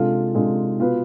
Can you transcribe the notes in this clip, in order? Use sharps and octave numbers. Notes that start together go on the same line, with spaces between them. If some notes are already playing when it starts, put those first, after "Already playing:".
Already playing: C3 G#3 D4 F4 A4
C3 G#3 D4 F4 A4
B2 B3 F4 B4